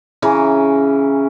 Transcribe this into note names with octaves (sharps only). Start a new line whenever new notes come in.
C#3 E3 C#4 A#5